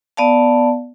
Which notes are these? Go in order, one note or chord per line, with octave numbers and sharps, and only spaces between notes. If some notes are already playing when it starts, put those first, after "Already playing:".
B3 D5 F5 A5